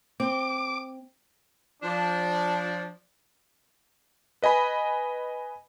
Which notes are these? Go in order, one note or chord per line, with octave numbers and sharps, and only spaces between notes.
C4 D6
F3 D4
B4 D#5 G#5 B5